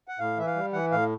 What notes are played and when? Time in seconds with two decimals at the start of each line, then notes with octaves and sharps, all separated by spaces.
0.08 F#5
0.19 A2 F5
0.37 E3 E5
0.47 F5
0.56 G3
0.73 E3 F#5
0.91 A2 F5